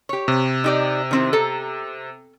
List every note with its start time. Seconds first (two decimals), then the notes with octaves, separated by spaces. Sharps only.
0.09 G4 C#5
0.28 C3
0.64 D#4 G4 D5
1.11 D#3 C4 E4
1.33 A4 A#5